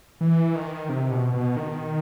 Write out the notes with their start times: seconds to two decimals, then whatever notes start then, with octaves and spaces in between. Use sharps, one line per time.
0.21 E3
0.55 D#3
0.89 C3
1.11 B2
1.34 B2
1.56 D#3